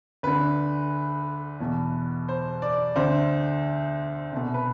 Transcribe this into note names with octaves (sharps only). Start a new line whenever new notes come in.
D2 D3 B4
E2 B2
C5
D5
D2 D3 C5
C2 B2
B4